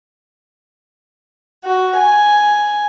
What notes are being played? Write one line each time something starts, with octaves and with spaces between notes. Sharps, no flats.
F#4
G#5